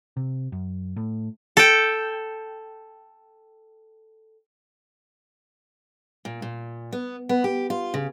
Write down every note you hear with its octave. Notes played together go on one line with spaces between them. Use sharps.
C3
F#2
A2
A4 G5
A#2
A#2
B3
B3
G4
F4
C#3